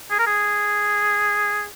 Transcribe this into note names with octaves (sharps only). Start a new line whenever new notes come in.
G#4
A#4
G#4